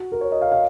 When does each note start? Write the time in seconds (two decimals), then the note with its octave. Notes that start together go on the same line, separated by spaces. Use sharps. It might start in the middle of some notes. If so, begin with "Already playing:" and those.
Already playing: F#4
0.12 A#4
0.21 C#5
0.32 D#5
0.41 F5
0.52 F5